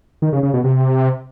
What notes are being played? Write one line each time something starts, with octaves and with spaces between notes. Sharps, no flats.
D#3
C#3
C#3
B2
C3